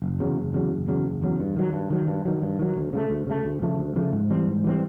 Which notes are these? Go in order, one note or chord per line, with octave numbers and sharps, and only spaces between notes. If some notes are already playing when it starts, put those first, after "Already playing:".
F#1
E2 C#3 F#3
F#1
E2 C#3 F#3
F#1
E2 C#3 F#3
F#1
E2 C#3 F#3
G2
D#3 F#3
G2
D#3 F#3
G2
D#3 F#3
G2
D#3 F#3
D2
C#3 F3 A3
D2
C#3 F3 A3
D2
C#3 F3 A3
D2
C#3 F3 A3
G#2
E3 G3 C4
G#2
E3 G3 C4